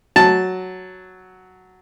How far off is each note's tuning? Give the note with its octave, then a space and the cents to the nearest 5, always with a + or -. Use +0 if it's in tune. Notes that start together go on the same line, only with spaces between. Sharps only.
F#3 +0 A5 +0